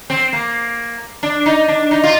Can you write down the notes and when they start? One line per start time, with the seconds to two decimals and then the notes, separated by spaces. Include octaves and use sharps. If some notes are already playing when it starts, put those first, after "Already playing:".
0.10 C4
0.33 A#3
1.23 D4
1.46 D#4
1.68 D4
1.91 D#4
2.04 F4